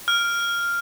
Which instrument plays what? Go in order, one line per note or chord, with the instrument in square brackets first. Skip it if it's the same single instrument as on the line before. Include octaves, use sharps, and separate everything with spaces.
[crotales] F6